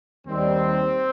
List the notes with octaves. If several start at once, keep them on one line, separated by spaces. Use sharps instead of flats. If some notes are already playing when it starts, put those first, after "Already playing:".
D#2 D#3 G3 C4